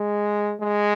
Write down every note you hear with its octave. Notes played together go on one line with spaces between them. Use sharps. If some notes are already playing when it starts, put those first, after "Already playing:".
Already playing: G#3
G#3